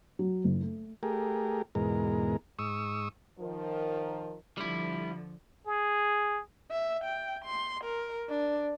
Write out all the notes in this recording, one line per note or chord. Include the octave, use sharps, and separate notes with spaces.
F#3
F#1
A3
A3 G4 G#4 A#4
E2 G#2 B2 G#3 A#4
G#2 C#6 D#6 E6
D#3 F3 A#4
D3 F3 G3 E4
G#4
E5
G5
C6
A#4
D4